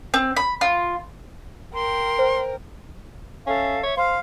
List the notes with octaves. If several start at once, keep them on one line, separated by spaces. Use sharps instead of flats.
C4
B5
F4
A#4 G5 C6
C5
C#4 A4 E5 F5
C#5 E5
C5 F5 F6